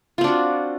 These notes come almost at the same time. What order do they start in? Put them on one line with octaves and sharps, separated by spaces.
F4 C4 D4 F#4